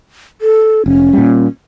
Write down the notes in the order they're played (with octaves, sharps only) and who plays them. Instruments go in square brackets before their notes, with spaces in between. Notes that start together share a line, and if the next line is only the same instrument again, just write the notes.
[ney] A4
[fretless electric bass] F1 [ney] C#4
[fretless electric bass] A#2 G3